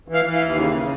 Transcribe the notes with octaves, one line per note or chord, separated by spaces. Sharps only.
E3
F5
E3
F5
D#2
C#3
C#3